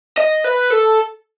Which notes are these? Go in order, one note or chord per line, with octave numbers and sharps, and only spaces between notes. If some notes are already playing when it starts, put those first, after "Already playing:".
D#5
B4
A4